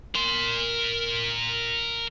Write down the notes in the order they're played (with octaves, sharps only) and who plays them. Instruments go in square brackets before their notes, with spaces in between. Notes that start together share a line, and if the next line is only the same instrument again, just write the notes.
[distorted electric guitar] A#4 C6